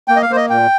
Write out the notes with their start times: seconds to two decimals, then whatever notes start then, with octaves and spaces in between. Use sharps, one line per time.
0.08 A#3 G5
0.16 D#5
0.22 F5
0.29 A#3 C5
0.36 D#5
0.50 A#2 G5